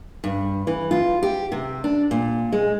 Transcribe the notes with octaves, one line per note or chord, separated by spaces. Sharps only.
G2
E3
F4
G4
C3
D4
A#2
G#3